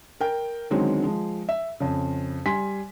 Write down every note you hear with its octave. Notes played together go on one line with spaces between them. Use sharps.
A#4 G5
D3 D#3 F#3 G#3 C4 C#4
F3 G#3
E5
F2 C#3
G3 G#5 C6 B6